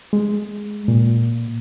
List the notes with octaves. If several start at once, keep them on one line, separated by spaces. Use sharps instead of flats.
G#3
A#2